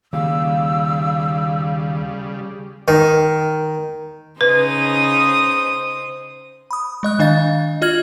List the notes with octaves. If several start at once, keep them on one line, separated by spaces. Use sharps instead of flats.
D#2 C#3 G3 F5 E6
D#3
C#3 D#4 B4 C5 D#6
B5 D#6
G#3 D#5 F#6
D#3 D4 D#5 F5 A6
F4 D#5 F6 G#6 F#7